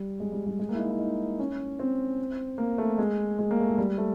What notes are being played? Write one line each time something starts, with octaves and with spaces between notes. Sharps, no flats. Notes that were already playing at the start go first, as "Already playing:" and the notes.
Already playing: G3
G#3
G3
G3
G#3
A#3
E4
D#4
E4
D#4
C#4
C4
A#3
A3
G#3
G#3
A#3
A3
G#3
G3
A3